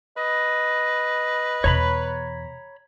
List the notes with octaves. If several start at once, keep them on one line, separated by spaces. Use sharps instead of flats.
B4 D#5
E2 B2 C#5 A#5 B5